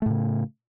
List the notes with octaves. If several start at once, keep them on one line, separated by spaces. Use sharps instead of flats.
A2 C#3 A3